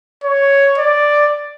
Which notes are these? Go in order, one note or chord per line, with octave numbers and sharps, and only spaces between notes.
C#5
D5